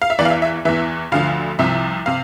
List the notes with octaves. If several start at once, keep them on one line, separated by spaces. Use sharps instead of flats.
F5
E5
E2 E3 D5
F5
E5
E5
E2 E3 E5
D2 D3 F3 F5
C2 C3 F3 E5
C3 F5